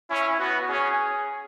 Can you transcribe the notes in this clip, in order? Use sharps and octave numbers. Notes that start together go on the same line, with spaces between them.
C#4 E4
B3 F#4
C#4 G#4